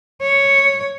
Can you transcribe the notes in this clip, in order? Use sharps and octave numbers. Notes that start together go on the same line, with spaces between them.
C#5